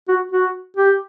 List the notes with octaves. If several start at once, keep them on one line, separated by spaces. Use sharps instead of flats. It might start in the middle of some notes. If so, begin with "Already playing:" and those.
F#4
F#4
G4